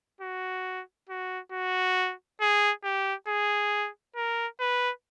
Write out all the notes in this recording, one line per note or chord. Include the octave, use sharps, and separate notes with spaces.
F#4
F#4
F#4
G#4
G4
G#4
A#4
B4